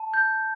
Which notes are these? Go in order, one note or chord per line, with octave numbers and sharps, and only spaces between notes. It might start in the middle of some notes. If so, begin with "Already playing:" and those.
Already playing: A5
G6